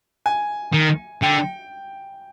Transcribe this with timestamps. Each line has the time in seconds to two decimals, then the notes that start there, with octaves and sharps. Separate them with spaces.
0.26 G#5
0.74 D#3
1.23 D3 G5